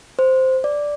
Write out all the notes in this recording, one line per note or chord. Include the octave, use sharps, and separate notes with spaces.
C5
D5